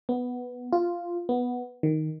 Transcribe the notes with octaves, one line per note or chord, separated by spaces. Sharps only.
B3
F4
B3
D#3